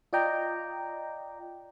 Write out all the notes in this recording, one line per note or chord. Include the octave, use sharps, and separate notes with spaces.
F4 D5 D#5 G5 A#5